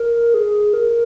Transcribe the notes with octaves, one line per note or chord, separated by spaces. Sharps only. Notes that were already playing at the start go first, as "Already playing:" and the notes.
Already playing: A#4
G#4
A#4